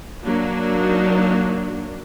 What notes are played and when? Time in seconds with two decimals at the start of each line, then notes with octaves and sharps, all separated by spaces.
0.24 F#3 A#3 D4
0.77 D#4